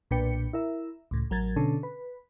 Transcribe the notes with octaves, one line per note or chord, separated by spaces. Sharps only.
B1 A#2 D4 B4 G5 C#7
E4 A#4 E5
C#2 A2
A1 F#3 A#4 G#6 A6
B2 D3 C#4 D4 A4
B4